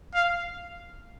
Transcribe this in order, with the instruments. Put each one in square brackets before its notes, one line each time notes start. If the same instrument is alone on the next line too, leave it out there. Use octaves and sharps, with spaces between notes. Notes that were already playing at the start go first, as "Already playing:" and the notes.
[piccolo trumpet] F5